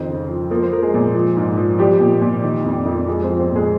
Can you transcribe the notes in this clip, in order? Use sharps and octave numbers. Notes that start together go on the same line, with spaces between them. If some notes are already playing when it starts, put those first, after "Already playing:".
Already playing: F2 D#3 C4 C5
C#3
F3
F3 A#3 A#4
C5
F3 A#4
G#3 G#4
A#2
F3
G#2
F3
F3 G3 G4
A#2
A#2
D#3
F2
F2
F3 G#3 G#4
C4 C5
F3
C4 C5
A#2 G#3 G#4